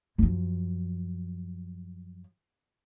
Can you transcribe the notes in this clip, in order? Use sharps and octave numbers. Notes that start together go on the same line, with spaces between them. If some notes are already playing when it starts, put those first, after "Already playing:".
F#2 F3